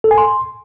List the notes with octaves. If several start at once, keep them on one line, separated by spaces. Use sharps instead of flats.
A4
G#5
C6